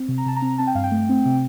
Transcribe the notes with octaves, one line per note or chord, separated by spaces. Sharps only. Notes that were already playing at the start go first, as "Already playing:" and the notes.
Already playing: C4
C3
A#5
C3 A5
A#5
C4
C4 A5
G5
G2 F5
G5
A3
C4
C3